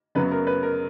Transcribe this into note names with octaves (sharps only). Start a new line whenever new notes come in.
F#2 C#3 F#3 B3 B4
A#4
B4
A#4